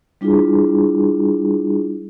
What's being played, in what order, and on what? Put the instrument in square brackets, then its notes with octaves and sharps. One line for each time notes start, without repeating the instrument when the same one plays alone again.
[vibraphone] G3 D4 E4 F4 G#4